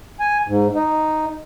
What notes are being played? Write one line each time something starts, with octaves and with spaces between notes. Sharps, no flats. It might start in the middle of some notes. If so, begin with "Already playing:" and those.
G#5
G#2
D#4